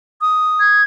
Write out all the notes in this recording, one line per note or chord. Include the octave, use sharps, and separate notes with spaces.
D#6
G#6